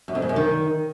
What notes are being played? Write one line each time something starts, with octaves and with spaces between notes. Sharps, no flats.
F#2
F2
G#2
F#2
D#3